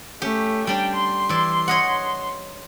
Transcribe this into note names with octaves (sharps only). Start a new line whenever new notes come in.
A3 C#4 G4
G3 D4 D5 G5
C6
E3 D5
C#5 D#5 F#5